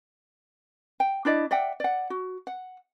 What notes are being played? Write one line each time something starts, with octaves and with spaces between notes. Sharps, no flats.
G5
D4 E4 D5 D#5
D5 E5 F#5 G5
D5 F#5
F#4
F#5